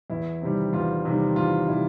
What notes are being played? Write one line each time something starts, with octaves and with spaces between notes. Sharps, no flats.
E2 E4
C3 D#3 G3
E2 F4
C3 D#3 G3
E2 F4
C3 D#3 G3 E4